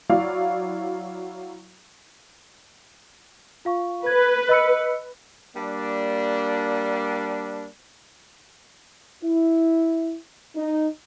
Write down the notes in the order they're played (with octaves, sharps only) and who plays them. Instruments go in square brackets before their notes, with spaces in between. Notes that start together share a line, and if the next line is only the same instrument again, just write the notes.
[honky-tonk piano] F#3 E4 D5 F5
[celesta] F4 F5 C#6
[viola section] B4 [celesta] G#6
[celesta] D#5 E6 C#7
[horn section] G3 A#3 D4
[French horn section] E4
D#4